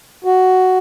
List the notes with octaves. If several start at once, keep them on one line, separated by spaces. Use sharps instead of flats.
F#4